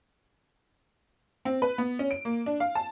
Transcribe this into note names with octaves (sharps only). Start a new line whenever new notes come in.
C4
B4
B3
C#4
D7
A#3
D4
F5
A5